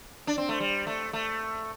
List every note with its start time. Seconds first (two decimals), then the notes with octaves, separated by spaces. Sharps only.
0.27 D4
0.38 C4
0.49 A3
0.60 G3
0.87 A3
1.13 A3